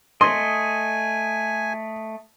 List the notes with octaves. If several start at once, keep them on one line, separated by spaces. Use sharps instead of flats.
A3 D#5 G#5 C6